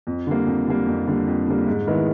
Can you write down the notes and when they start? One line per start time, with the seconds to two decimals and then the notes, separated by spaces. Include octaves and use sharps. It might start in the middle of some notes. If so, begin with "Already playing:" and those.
0.07 F2
0.27 D3 G3 A#3
0.47 F2
0.67 D3 G3 A#3
0.87 F2
1.07 D3 G3 A#3
1.27 F2
1.48 D3 G3 A#3
1.67 G#2
1.87 D#3 G#3 B3 E4